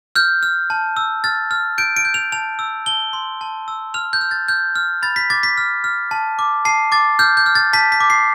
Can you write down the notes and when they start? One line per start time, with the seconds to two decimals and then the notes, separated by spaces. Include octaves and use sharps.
0.15 F6 G6
0.43 F6
0.70 A5
0.97 E6
1.24 F6 A6
1.51 F6
1.78 G6 D7
1.97 D7
2.05 G6
2.14 F7
2.32 A5 F7
2.59 E6
2.86 A5 G7
3.13 C6
3.41 A5
3.68 E6
3.94 F6 F7
4.13 G6
4.21 F6
4.31 A6
4.48 F6 G6
4.76 F6
5.02 B5 A6
5.16 B6
5.30 D6 A6
5.43 B6
5.57 F6
5.84 F6
6.11 A5
6.39 D6
6.65 A5 C7
6.92 D6 A6
7.19 F6 G6
7.37 G6
7.46 F6
7.55 A6
7.73 A5 B6
7.92 B6
8.00 D6
8.10 C7